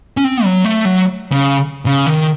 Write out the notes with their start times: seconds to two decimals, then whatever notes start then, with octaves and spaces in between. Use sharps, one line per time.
0.17 C#4
0.24 C4
0.44 F#3
0.65 A3
0.85 F#3
1.32 C#3
1.86 C#3
2.07 D#3